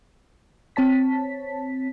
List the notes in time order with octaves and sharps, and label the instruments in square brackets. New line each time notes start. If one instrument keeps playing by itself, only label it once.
[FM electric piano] C4 C#5 A5 B6